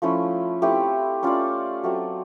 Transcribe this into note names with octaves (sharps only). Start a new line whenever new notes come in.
F3 A3 C#4 E4
A3 C4 E4 G4
C#4 F4 A4 D5
F#3 A3 C4